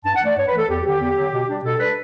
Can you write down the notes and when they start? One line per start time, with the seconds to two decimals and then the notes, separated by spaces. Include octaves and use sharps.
0.05 G2 A5
0.16 F#5
0.21 E3 A3 D5
0.37 G2 C#5
0.47 B4
0.53 E3 A3 A4
0.69 E2 G4
0.84 D3 F#3 G4
1.00 E2
1.16 D3 F#3
1.32 B2
1.48 G3 D4
1.63 B2 A4
1.79 G3 D4 B4